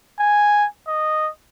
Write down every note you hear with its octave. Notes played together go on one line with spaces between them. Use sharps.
G#5
D#5